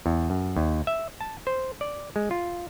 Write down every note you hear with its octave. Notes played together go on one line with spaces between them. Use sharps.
E2
F#2
D#2
E5
A5
C5
D5
G#3
F4